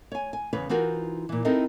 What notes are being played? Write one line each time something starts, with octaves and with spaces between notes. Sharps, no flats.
C#5 G#5
G#5
E2 C#3 B4 C#5
E3 D#4 F4 F#4 A#4 C5
A#2 E3
C4 D#4 E4 A4 A#4 D#5